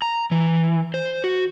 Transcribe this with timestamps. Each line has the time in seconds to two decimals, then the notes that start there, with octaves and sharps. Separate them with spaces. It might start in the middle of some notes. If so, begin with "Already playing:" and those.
0.02 A#5
0.31 E3
0.94 C5
1.24 F#4